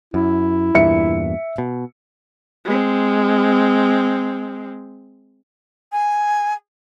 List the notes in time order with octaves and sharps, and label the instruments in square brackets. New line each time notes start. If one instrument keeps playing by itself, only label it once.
[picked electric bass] F#2 [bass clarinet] E4
[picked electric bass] E2 G2 A#2 [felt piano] E5 C#7
[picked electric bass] B2
[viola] G#3 C4
[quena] G#5